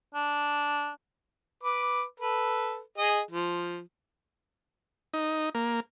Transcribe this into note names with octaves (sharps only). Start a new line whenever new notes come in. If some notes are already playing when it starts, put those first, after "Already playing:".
D4
B4 D6
A4 B4
G#4 D#5
F3
D#4
A#3